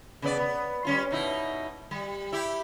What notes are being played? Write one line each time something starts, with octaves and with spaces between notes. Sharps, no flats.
C#3 B3 D5
B3
G3 C#4 F4
B2 D#4 E4
G3
E4 G4